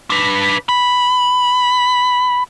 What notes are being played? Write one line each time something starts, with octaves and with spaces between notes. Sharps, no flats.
D4 B4
B5